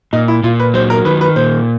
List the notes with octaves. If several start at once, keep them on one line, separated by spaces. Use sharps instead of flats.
A#2 D#4
E4
A#2 F4
B4
F#3 C5
A#4
D#3 B4
B4
A#2 C5